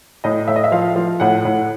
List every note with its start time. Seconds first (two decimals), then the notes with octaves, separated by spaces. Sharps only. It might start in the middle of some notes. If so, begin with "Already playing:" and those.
0.24 A2 D#5
0.47 A2 E5
0.56 D#5
0.64 E5
0.72 F3 F5
0.96 F3
1.20 A2 F#5
1.45 A2